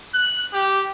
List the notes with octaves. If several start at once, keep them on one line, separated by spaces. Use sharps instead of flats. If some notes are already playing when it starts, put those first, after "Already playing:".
F#6
G4